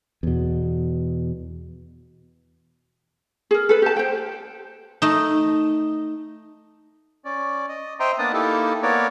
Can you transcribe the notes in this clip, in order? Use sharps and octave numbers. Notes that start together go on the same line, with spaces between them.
E2 B2
G#4 A#4
A4 B4
G4 A5
C5 G5
A3 D#4
C#4 D5
D#5
C5 D#5 E5 G5 A#5 C6
A#3 B3 D4 D5 A5 D#6
A#3 D#4 E4 G4 A4
A#3 B3 A#4 C#5 D5